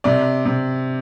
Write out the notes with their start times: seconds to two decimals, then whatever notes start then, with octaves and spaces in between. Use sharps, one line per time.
0.04 C3 D5
0.46 C3